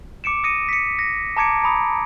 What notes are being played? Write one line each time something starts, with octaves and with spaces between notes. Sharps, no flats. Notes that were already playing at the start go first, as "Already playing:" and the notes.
D6 C#7 D7 E7
D#6 A#6 C#7 D#7
B6 C#7
A#6
A5 A#5 D6 G#6 C#7 D7
A#5 B5 D#6